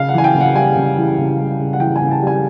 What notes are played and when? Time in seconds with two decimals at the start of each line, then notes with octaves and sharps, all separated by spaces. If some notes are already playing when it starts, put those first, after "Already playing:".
Already playing: C#3 F5
0.09 F#5
0.14 E3 G#5
0.24 G5
0.35 C#3
0.40 F#5
0.55 G3 G#5
0.76 C#3
0.97 E3
1.18 C#3
1.39 G3
1.59 C#3
1.73 F#5
1.80 E3 G5
1.96 G#5
2.01 C#3
2.11 A5
2.22 G3
2.27 G#5